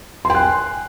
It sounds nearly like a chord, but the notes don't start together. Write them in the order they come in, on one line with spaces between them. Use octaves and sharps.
C6 G5 F#6 G#5